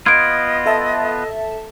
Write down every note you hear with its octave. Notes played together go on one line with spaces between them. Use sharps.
B3 F4 D#5 G#6 D7
A4 E5 A5